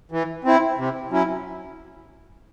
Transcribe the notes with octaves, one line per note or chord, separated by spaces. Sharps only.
E3
C4 E4
C3
F#3 C#4 E4